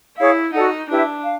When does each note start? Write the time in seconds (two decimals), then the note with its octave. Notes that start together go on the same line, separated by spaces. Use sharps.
0.17 E4 G#4 C#5 F5
0.53 D#4 F#4 A4 D5 F#5
0.89 D4 E4 G4 B4 E5
1.24 F5